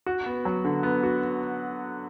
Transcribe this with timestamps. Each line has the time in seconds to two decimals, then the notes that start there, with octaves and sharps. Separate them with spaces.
0.06 F#4
0.26 B3
0.45 F#3
0.65 D3
0.83 B3
1.03 F#4